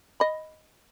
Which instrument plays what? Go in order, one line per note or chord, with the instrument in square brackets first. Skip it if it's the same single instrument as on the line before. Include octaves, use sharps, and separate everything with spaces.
[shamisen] D#5 B5